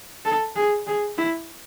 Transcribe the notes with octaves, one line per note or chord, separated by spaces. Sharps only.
A4
G#4
G#4
E4